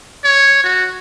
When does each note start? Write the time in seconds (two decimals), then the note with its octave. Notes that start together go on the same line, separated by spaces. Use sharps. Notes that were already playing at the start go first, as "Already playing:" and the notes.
0.24 C#5
0.64 F#4